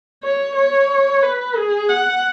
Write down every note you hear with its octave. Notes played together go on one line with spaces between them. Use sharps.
C#5
C#5
B4
G#4
F#5